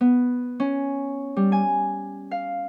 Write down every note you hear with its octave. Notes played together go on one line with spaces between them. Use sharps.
B3
C#4
G3
G#5
F5